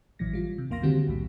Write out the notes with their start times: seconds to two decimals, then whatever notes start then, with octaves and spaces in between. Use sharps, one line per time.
0.19 A1 A#2 E3 F#3 A#6
0.33 G3 F4
0.58 C3
0.70 C2 F2 A#3 F5 C6 A#6
0.82 D3 D#3 G3 C4 F#4 G4
1.07 B1 E2 A2 G3